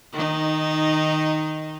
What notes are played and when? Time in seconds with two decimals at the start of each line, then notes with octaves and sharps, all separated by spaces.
0.13 D#3 D#4